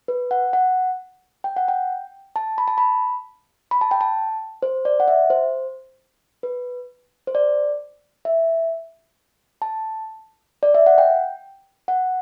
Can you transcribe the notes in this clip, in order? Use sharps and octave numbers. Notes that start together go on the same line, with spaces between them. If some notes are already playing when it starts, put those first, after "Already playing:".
B4
F#5
F#5
G5
F#5
G5
A5
B5
A5
B5
B5
A5
G5
A5
C5
D5
F#5
E5
C5
B4
C5
D5
E5
A5
D5
E5
F#5
G5
F#5